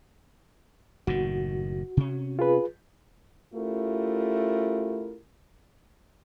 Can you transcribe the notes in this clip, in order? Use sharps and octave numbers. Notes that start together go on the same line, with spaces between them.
F#1 A2 D#3 F#4
C3 C#4
F4 G#4 B4
A3 C#4 E4 F4 G4 A#4